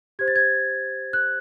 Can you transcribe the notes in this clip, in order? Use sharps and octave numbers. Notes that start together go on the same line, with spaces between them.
G4 C5 G#6
A6
G#6
F#6